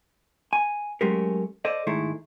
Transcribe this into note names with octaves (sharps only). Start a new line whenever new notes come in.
G#5
F#3 G#3 A3 C#4 G4 A#4
A4 C5 D5 D#5
G#2 D#3 G#3 A3 E4